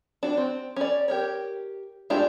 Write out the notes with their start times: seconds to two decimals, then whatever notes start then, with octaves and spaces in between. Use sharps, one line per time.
0.23 D4 F#4
0.37 C4
0.76 C#4 D5
1.08 G4 A#4 C#5
2.10 G#3 A3 D4 F4 G4